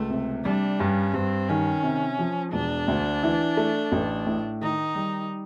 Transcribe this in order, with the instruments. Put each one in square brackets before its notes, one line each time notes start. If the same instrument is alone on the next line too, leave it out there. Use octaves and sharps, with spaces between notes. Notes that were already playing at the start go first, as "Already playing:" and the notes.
Already playing: [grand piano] C#2 [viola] A3
[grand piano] C3
[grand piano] G3 [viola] D4
[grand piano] G2 [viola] C#4
[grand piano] G2 [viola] C4
[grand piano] D#3 [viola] C#4
[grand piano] C3
F3
[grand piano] E1 [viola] D4
[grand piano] D2
E3
A3
A1
A2
[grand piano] D#3 [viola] D#4
[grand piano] G3